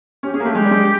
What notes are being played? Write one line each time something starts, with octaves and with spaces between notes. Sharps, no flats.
C#4 G4
C#4 G#4
A#3
A3 G4
G#3 G4
G3
G#3